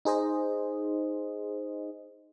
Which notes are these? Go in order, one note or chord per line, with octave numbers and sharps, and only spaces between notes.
D#4 G#4 C5 D#5